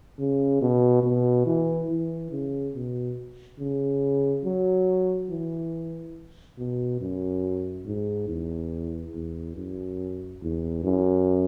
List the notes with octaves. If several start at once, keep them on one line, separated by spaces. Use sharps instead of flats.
C#3
B2
B2
E3
E3
C#3
B2
C#3
F#3
E3
B2
F#2
G#2
E2
E2
F#2
E2
F#2